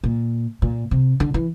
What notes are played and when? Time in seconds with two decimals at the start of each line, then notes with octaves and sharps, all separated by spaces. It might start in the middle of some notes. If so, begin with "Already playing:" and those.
0.04 A#2
0.62 A#2
0.91 C3
1.20 D3
1.34 E3